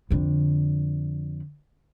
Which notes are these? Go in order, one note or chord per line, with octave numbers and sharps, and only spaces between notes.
F2 D3